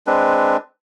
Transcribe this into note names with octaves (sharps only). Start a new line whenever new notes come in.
G#3 C4 D4 B4